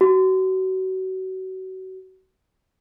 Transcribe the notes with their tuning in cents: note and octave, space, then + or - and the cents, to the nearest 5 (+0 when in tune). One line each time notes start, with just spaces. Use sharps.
F#4 +30